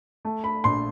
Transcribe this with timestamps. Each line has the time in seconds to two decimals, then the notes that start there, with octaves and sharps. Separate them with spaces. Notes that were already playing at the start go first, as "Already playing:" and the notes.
0.25 A3
0.44 B5
0.64 A#1 C6